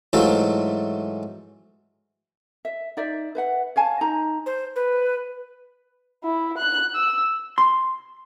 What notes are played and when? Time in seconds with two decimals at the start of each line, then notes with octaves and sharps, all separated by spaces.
0.13 G#2 E3 F#3 A3 F4
2.65 E5
2.97 D#4 D5 E5
3.35 B4 E5 F#5
3.76 C#5 F5 G#5 A5
4.01 D#4 A#5
4.46 C5
4.76 B4
6.24 E4
6.58 F#6
6.95 E6
7.58 C6